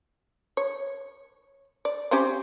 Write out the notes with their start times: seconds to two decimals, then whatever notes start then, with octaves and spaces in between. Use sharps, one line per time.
0.57 C#5
1.85 D5
2.11 C4 C#4 G4